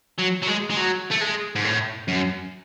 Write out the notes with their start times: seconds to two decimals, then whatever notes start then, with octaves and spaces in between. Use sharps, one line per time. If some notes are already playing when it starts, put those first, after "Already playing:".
0.19 F#3
0.43 F#3
0.48 G#3
0.70 G#3
0.77 F#3
1.11 A3
1.21 G#3
1.56 G#2
1.65 A2
2.08 F#2